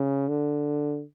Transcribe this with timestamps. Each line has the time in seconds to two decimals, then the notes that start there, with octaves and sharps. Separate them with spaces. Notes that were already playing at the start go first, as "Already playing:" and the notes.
Already playing: C#3
0.28 D3